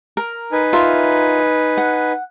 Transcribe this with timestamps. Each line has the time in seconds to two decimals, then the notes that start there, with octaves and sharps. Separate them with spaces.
0.17 A#4
0.52 D#4 B4 G#5
0.73 F4 A#4 E5
1.78 F#5